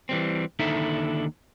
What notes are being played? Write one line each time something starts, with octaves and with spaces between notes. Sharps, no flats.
E3 G3 C4
D#2 D3 D#4 E4 A4 E5